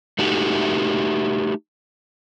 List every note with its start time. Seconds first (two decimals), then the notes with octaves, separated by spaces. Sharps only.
0.19 A3 D#4 F#4 G4